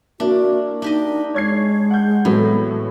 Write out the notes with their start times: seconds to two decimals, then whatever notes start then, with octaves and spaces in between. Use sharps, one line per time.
0.20 A#3 D4 E4 F#4
0.82 D4 D#4 G4 D#5
1.34 G#3 C#5 G#6 C7
1.90 F#5 G6
2.25 A2 E3 F#3 B3